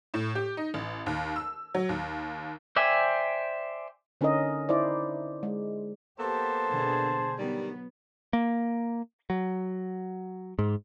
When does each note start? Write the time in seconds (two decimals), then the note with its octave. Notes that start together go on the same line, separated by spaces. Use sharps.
0.14 A2
0.35 G4
0.57 D#4
0.74 A1
1.06 D#2
1.36 E6
1.74 F#3
1.89 D#2
2.76 C5 D5 E5 G5 G#5
4.21 D3 C#4 D#4 A#4 D#5
4.69 D#4 E4 C5 D5
5.43 G#3
6.20 A#3 B3 G4 A4 C5 A5
6.68 B2 D3 G#4
7.38 D#3 F#3 G3 B3
8.33 A#3
9.30 F#3
10.59 G#2